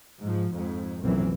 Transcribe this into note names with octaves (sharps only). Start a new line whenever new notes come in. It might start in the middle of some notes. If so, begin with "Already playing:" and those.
G#2 F3
F2 G#2
F1 B1 F#2 A#2 E3 C4